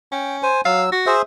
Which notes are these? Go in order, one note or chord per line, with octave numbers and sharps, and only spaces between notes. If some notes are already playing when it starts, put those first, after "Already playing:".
C#4 G5
C5 G#5
F#3 F5 E6
F#4
G#4 C5 E5